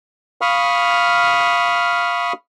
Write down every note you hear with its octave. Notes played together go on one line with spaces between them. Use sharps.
F5 B5 C#6 D#6 F6